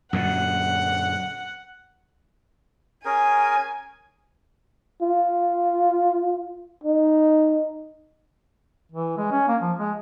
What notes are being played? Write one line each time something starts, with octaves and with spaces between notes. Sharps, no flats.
F#2 A#2 D3 F#5
C#4 G#4 A#4 G#5
F4
D#4
E3
G#3
C#4
A#3
F3
G#3